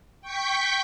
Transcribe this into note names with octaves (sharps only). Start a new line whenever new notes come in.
G5 C#6 G6 B6